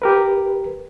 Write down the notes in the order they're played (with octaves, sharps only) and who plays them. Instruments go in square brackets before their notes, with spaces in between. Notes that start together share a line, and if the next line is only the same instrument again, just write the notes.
[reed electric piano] G4 A#4 B4